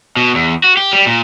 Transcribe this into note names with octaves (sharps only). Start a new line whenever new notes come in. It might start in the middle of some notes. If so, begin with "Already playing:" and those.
B2
E2
F#4
G4
G3
A#2